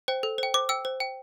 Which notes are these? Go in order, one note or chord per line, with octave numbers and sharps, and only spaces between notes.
C5 G5
A4
C5 G5
C5 D6
G5 E6
C5
G5